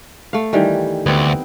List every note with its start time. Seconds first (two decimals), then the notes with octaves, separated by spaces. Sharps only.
0.33 A3 F5
0.53 D#3 E3 G3
1.06 D2 B3 C4